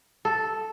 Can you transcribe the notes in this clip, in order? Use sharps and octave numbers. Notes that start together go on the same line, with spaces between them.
A4